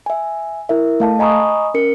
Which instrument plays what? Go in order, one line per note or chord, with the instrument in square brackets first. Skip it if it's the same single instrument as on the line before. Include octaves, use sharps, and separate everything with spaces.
[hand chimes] E5 G#5
E4 A#4 E5
A3 F5 A5
D#5 G#5 A#5 B5 C#6 D#6
C#4 A#4 C#7